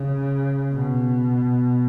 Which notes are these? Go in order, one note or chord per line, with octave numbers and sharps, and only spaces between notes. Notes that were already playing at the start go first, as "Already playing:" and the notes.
Already playing: C#3
B2